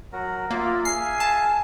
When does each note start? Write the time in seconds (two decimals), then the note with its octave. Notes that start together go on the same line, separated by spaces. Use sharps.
0.13 F#3 F#4 A#4
0.51 A#3 F4 A#4 D5 E5
0.85 G#4 E5 F5 G#5 C7
1.20 A5